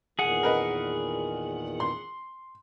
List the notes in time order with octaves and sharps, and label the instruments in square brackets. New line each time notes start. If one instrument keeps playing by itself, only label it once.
[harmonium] E2 A#2 D#3 [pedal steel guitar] G#4 F#5
[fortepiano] A#4 B4 D#5
C6